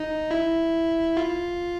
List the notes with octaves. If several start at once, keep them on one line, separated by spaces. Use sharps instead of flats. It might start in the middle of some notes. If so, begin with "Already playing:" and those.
Already playing: D#4
E4
F4